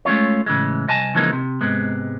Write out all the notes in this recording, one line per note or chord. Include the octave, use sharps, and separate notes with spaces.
G#3 A3 C#4 F4 C#5
A2 C#3 E3 G#3
C2 D#5 G#5 A5
C#3 E3 F3 G#3 A#3 D#4
C3
G#2 C3 G#3 B3